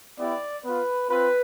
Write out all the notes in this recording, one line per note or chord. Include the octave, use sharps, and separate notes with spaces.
B3 E4 G4 D5
B3 F4 B4
C4 F4 B4